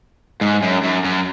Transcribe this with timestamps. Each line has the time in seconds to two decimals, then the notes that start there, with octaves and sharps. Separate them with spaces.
0.41 G#2
0.62 F#2
0.83 F#2
1.05 F#2